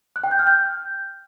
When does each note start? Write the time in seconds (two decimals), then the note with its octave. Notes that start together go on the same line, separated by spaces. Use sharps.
0.16 F#6
0.24 G5
0.31 G6
0.39 F6
0.47 G6